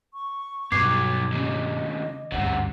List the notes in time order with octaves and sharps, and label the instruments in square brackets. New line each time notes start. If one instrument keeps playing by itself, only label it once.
[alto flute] C#6
[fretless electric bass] G2 B2 [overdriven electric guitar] F#3 B3 [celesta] D6 G#6 C7
[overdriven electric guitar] D#2 C#3 [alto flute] D#5
[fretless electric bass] G#1 D2 G2 [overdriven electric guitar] C#3 C4 [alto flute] F#5